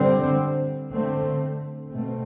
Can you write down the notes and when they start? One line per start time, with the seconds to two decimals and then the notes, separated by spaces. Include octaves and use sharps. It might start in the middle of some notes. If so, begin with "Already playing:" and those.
Already playing: D3 G3 C4
0.92 D3 A3 C4
1.91 B2 A3 C4